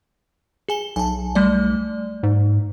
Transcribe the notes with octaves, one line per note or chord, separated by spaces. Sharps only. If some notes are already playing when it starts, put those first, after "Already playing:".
G#4 G#5 G7
B1 G#5 A5
G3 A3 D5
G#2